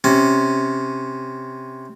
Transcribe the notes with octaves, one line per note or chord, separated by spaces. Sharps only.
C3 C#4